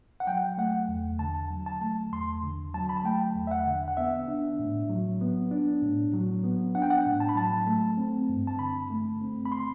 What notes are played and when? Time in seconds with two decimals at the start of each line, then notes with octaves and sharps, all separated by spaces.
0.20 F#5
0.27 F#3 G5
0.58 A3 F#5
0.88 E2
1.19 D3 A5
1.50 F#3
1.66 A5
1.81 A3
2.13 E2 C6
2.43 D3
2.74 F#3 A5
2.89 B5
2.97 A5
3.04 A3 G5
3.35 E2
3.47 E5
3.51 F#5
3.66 D3
3.88 F#5
3.97 B3 E5
4.28 D4
4.59 A2
4.89 F#3
5.21 B3
5.51 D4
5.82 A2
6.14 F#3
6.44 B3
6.75 D4 F#5
6.82 G5
6.90 F#5
7.06 A2
7.20 A5
7.29 B5
7.36 F#3 A5
7.67 A3
7.97 C4
8.29 G2
8.47 A5
8.59 D3 B5
8.90 A3
9.21 C4
9.46 B5
9.52 C6